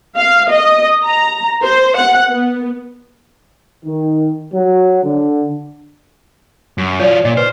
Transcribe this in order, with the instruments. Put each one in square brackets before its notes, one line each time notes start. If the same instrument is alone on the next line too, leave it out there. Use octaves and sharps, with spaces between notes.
[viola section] F5
D#5
A#5
C5
F#5
B3
[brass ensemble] D#3
F#3
D3
[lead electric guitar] F#2
[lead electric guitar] F#3 F4 [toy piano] C#5 D5
[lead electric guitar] A#2 [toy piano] D#5
[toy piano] B4 [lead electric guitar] C5